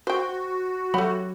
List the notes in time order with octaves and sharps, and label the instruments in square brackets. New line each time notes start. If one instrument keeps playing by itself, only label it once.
[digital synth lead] F#4 [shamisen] C5 G5
[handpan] F#3 C#5 [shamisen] A3 G4 [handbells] F#5 B5